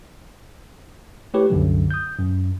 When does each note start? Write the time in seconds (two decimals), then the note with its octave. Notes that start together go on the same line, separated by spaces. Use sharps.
1.34 A3 E4 G4 B4 C#5
1.50 C2 F#2 D3 F#3
1.91 D#6 G6
2.19 F#2